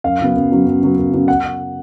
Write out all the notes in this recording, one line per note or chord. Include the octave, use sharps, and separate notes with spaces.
F#2 F5
C#3 F#3 B3
F#2
C#3 F#3 B3
F#2
C#3 F#3 B3
F#2
C#3 F#3 B3
F#5